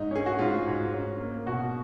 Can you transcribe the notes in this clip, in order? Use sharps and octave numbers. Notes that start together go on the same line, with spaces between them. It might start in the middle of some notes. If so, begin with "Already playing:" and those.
Already playing: G#2 D#4
C#4 G#4
F#4
G#2 F4
G#2
C#4
A#3
B2 F#4